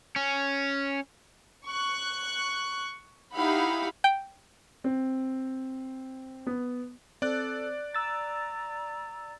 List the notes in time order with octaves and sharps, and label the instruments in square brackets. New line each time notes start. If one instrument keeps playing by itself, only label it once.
[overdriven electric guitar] C#4
[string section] C#6 F#6
D#4 E4 G4 F5 F#5 B5
[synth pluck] G5
[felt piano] C4
B3
[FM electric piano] C4 [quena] A4 [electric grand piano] D5 F#6
[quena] A#5 [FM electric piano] E6 A6